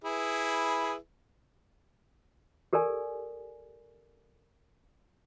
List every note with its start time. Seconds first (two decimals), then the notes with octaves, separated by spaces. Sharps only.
0.04 E4 G#4 B4
2.73 G4 A4 A#4 D5 G#5